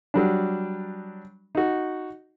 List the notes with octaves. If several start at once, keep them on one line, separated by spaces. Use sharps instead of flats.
F#3 G3 D4
D#4 F#4